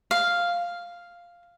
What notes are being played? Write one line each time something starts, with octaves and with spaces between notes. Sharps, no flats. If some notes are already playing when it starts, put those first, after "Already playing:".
F5